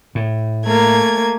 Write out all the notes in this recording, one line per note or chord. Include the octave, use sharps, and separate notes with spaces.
A2
A3 A#3 G#6